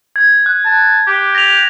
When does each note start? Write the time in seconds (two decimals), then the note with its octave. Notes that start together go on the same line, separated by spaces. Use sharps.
0.16 G#6
0.46 F#6
0.65 A5
1.07 G4
1.35 A#6 F7